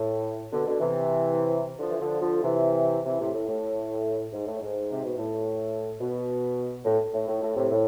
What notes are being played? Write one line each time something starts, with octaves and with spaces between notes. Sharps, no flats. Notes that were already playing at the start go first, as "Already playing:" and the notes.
Already playing: A2
B2 D3
B2 D3
C3 E3
D3 F3
E3
D3 F3
D3 F3
C3 E3
C3 E3
A2 C3
A2
A2
G#2
A2
G#2
C3
B2
A2
B2
A2
A2
A2
A2
A2 C3
A2